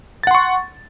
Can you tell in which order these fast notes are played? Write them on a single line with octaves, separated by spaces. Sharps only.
A6 F#5 C6 C#6